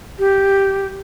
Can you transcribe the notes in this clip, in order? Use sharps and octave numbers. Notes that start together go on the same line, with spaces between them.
G4